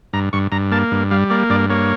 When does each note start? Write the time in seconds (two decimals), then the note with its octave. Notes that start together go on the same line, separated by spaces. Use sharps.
0.13 G2 A#5
0.33 G2 C#6
0.52 G2 A#5
0.71 A#3 A5
0.92 G2
1.11 G3 F5
1.30 A#3 D5
1.50 G2 D5
1.70 A#3 C#5